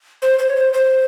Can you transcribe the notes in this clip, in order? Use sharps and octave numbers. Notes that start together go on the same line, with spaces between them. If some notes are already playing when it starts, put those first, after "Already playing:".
C5
C5
C#5
C5
C5